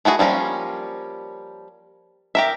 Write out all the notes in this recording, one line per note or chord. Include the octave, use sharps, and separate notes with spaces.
A3 E4 F#4 G#4
F3 G3 A#3 C#4
G4 A#4 E5